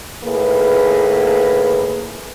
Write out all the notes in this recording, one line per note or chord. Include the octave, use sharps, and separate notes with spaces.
A2 D#3 A#3 G#4 B4